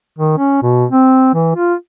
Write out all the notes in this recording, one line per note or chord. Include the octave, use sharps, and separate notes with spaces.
D#3
C#4
B2
C4
E3
F4